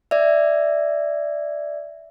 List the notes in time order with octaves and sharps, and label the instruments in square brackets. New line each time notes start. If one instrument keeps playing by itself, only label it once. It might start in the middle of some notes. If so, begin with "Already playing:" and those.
[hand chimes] D5 E5